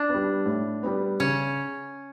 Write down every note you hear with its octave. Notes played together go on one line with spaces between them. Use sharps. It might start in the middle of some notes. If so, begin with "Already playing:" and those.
Already playing: D4
B3
G3
A2
G3 B3
C#3 C#4